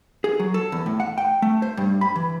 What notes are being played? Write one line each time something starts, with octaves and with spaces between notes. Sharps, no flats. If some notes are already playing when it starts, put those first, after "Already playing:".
G#4
F#3
A4
E2
A2
F#5
G5
A3
C5
G2
B5
E3